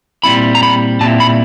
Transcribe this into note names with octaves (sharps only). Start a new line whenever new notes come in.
A#2 G3 C4 E4 B5
A#5
B5
A#2 G3 C4 E4 A5
B5